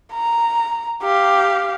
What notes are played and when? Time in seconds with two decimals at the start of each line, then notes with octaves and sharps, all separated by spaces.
0.13 A#5
1.03 G4 F5